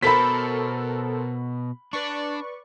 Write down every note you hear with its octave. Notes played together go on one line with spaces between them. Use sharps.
B2 A4 A#4 C5 B5 B6
D4 B4 D5 C#6